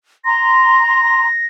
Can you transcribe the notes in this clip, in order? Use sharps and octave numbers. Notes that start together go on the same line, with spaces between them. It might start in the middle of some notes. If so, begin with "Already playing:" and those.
A#5 C6 A#6